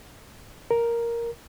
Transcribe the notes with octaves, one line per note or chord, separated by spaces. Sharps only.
A#4